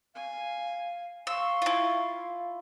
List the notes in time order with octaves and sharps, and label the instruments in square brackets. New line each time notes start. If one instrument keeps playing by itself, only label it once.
[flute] F5 [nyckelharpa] G#5
[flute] F5 [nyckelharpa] C6 C#6 [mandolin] E6
[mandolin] E4 F4